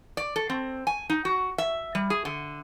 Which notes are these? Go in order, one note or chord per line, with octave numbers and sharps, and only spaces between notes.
D5
A4
C4
G#5
D#4
F#4
E5
G3
G#4
D3